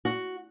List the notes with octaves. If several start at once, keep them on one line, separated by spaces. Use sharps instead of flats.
F#4